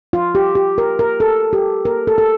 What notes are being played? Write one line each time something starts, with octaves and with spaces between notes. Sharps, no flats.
F4
G4
G4
A#4
A#4
A4
G4
A#4
A4
A4